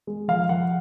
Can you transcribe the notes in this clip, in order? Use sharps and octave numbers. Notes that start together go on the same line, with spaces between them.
G#3
F3 F5
F3 F#5